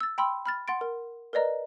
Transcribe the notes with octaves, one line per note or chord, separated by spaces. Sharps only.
E6 A6
G5 B5 C6 E6
B5 F6 A6
F#5 C6 A6 D7
A#4
A#4 B4 D5 D#5 A#5